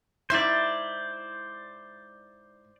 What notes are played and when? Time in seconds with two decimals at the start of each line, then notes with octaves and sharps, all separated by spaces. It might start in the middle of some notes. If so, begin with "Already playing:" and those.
0.30 G#2 E4 C5 D5